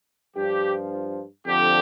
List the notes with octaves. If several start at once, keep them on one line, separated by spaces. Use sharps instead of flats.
G2 F3 G4
F2 D3 F3 G4